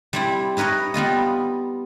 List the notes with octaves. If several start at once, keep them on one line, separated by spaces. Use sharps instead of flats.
G3 C4 E4
D#4 A#4 B4 C#5 D#5
G3 B3 F4 D#5